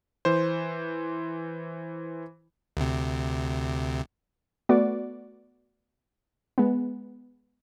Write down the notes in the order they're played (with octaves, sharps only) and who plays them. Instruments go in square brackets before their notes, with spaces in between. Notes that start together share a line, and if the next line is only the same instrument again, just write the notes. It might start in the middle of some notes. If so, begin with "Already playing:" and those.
[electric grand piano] E3 C5
[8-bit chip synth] D2 C3
[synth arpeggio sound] A3 B3 F#4 D5
G#3 B3